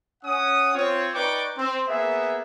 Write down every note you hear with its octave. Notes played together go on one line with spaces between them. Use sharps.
C#4 F#5 D#6
C4 F4 C#5
D#4 B4 D5 G5 C#6 D6
C4
A#3 B3 G#4 E5